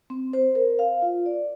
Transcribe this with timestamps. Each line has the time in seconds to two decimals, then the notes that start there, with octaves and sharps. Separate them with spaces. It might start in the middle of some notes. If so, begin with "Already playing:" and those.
0.10 C4
0.33 C5
0.55 A#4
0.79 F5
1.02 F4
1.26 D5